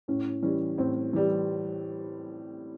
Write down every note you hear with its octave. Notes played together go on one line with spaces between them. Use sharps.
A2 C#4
E3 G3 C#4
A2 C4
E3 G3